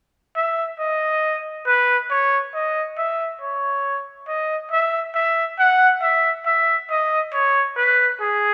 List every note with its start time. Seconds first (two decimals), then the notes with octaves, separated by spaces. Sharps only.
0.36 E5
0.79 D#5
1.67 B4
2.10 C#5
2.54 D#5
2.98 E5
3.41 C#5
4.28 D#5
4.71 E5
5.15 E5
5.59 F#5
6.02 E5
6.46 E5
6.90 D#5
7.33 C#5
7.77 B4
8.20 G#4